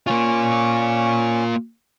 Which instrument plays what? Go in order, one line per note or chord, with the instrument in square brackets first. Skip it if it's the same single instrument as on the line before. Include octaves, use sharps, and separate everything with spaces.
[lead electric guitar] A#3 F4 [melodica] C#4 C#6